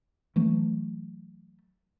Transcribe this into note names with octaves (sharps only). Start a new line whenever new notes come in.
E3 F#3 A3